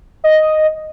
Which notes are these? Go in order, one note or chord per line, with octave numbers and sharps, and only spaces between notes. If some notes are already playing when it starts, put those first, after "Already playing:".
D#5